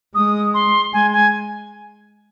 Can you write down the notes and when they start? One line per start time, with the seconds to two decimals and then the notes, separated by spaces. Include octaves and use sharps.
0.15 G#3 D#6
0.54 C6
0.93 G#3 G#5
1.13 G#5